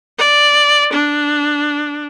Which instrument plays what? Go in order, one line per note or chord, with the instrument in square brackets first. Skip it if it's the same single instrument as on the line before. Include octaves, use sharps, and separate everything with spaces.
[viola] D5
D4